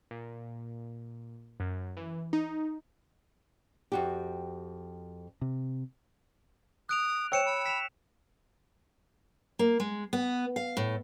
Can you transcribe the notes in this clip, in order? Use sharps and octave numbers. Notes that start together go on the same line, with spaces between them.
A#2
F#2
E3
D#4
F2 F#4 G4
C3
D#6 F#6 D7 F7
C5 C#5 G5 E6 C#7 E7
B5
B6 E7 F7
A#3
G#3
B3
F5
A2